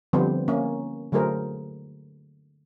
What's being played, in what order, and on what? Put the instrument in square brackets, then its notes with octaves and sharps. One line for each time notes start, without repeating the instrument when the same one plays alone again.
[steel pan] D3 F3 G3 B3 C4 C5
A#3 C#4
D3 F#3 A3 G#4 A#4 C5